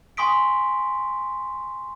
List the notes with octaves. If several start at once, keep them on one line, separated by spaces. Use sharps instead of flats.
G#5 C6 C#6 D#6 B6 D7